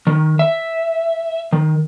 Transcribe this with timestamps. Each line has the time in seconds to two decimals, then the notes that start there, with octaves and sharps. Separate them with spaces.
0.07 D#3
0.39 E5
1.53 D#3